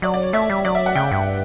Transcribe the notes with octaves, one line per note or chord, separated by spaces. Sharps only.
F#3 D5
D5
C#5
A3 E5
G3
F#3 D5
E5
F#5
C#3 G5
G2